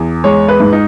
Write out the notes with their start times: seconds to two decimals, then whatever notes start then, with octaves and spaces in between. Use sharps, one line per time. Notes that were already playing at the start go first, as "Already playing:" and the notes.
Already playing: E2
0.24 G#3 C#5
0.48 B4
0.60 G#2
0.73 D#4